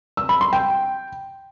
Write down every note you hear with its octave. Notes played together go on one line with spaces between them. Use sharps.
E6
B5
C6
G5